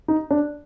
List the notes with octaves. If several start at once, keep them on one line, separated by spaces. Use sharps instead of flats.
D#4
D4